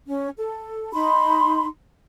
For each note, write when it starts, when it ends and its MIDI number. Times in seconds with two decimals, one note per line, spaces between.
0.07 0.28 61
0.36 0.90 69
0.93 1.66 63
0.93 1.66 83
0.93 1.66 84